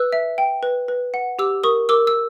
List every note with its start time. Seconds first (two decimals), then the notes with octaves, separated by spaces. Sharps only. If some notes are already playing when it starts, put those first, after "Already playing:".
Already playing: B4 E6 F#6
0.12 E5
0.38 G5
0.63 B4
0.88 B4
1.14 F#5
1.39 G4 D6 E6
1.63 A#4 C#6 D#6
1.89 A#4 D6 E6
2.07 E6